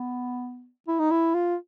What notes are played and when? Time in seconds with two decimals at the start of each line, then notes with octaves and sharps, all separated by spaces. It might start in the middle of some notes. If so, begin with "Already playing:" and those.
Already playing: B3
0.88 E4
1.00 D#4
1.11 E4
1.35 F4